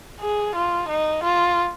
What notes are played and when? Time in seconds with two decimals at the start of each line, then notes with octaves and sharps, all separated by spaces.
0.21 G#4
0.56 F4
0.89 D#4
1.24 F4